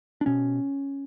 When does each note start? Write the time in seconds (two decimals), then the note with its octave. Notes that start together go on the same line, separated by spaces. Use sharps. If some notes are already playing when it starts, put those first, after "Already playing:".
0.21 D4
0.26 B2 C#4